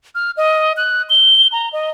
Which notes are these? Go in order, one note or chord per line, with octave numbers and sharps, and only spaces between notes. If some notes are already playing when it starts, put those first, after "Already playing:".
F6
D#5
F#6
G7
A#5
D#5